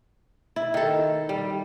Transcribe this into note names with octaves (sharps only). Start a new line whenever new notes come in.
E4
D#3 A4
G3